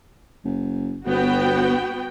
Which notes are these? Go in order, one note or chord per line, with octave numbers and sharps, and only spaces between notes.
F#1
G1 B3 F#4 G5